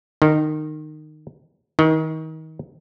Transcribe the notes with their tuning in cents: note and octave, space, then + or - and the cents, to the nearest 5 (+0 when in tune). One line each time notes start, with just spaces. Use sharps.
D#3 -20
D#3 +30